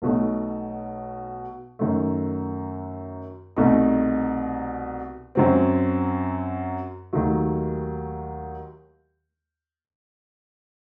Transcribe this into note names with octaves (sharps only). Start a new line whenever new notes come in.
B1 B2 A3 D#4
F#2 D#3 A3
C2 B2 A3 D#4
F#2 F#3 C4
D#2 D#3 F#3 A3